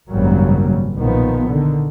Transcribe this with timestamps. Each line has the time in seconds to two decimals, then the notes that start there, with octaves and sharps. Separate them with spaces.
0.11 G#1 F#2 C#3 F#3 G3 A#3
0.96 B1 A#2 D#3 F3 B3
1.48 D3 D#3